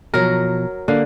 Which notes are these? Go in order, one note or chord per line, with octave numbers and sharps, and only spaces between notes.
B2 F3 F#3 A#4
D3 A#3 A#4 F5